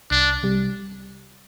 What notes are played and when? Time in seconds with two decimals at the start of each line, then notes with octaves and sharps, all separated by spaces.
0.11 C2 D4
0.43 C3 G3